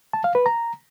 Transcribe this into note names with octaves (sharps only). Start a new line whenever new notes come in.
A5
F5
B4
A#5